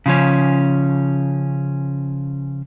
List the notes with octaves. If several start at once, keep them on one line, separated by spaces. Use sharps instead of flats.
C#3 F3 C#4